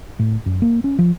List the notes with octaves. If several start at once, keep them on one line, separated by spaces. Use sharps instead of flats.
A2
F#2
A#3
C#4
F3